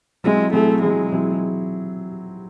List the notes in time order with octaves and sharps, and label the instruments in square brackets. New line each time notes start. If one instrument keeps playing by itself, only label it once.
[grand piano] F#3 C4 E4 G#4 [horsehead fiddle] G#3
[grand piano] F#3 C4 E4 G#4 [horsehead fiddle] A3
[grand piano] F#3 C4 E4 G#4 [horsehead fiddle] G#3
[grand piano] F#3 C4 E4 G#4